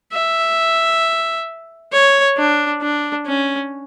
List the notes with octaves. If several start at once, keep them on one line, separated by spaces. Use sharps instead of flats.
E5
C#5
D4
D4
C#4